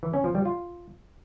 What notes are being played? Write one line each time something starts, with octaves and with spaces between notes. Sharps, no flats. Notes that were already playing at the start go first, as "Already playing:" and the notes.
E3
C#4
F3
G3
F4